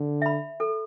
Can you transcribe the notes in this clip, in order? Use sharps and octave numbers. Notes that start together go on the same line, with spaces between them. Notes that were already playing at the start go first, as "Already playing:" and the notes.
Already playing: D3
E5 B5
A4